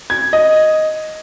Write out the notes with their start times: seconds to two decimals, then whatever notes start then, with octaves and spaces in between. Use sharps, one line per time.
0.10 G#6
0.33 D#5